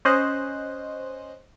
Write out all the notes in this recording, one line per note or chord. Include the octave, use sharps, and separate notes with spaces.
C#4 C5 D#5 F#6